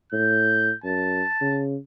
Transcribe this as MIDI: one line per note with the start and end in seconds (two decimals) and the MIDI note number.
0.13 0.71 45
0.13 0.75 91
0.84 1.22 42
0.84 1.62 81
1.41 1.76 49